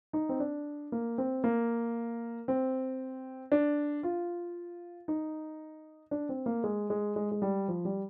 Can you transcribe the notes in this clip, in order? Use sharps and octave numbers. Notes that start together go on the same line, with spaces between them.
D#4
C4
D4
A#3
C4
A#3
C4
D4
F4
D#4
D4
C4
A#3
G#3
G#3
G#3
G#3
G3
F3
G3